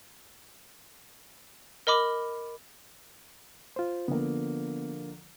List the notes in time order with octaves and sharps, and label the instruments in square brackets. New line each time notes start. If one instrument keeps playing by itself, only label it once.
[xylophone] A#4 D#5 B5 D6
[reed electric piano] F4 C5
[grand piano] D3 F3 A#3 [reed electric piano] B3